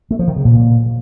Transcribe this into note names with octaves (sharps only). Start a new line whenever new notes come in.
A3
F3
D#3
C#3
A#2